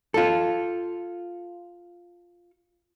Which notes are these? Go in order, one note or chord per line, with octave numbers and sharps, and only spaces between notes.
F4 A4